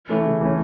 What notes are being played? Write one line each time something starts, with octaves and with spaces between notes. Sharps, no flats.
E3 A3 C#4
C#3
E3 A3 C#4